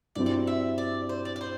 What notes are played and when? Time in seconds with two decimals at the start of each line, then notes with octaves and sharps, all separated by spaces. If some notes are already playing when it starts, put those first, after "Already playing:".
0.15 G2 F#3 C4 E4 D5
0.26 D5
0.47 E5
0.78 D5
1.09 C5
1.25 D5
1.36 D5
1.41 C5